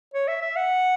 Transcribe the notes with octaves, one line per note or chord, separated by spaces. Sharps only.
C#5
E5
E5
F#5